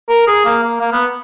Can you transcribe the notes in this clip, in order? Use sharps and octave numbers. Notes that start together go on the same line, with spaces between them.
A#4
G#4
A#3
A#3
A#3
B3